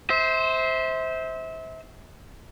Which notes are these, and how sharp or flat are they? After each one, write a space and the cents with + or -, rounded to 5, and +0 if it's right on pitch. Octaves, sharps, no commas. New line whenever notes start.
C5 +0 E5 -30